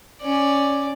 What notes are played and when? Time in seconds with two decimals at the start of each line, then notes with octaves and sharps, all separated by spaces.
0.22 C#4 D5